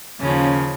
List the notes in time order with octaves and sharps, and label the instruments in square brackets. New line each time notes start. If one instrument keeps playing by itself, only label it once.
[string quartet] D#2 C#3 F3 C#4